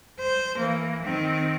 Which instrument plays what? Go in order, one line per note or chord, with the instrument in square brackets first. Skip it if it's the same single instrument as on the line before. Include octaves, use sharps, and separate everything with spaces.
[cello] C5
E3 A#3
D#3 C4